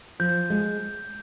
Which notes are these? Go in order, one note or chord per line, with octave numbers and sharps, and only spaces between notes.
F3 G6
G#3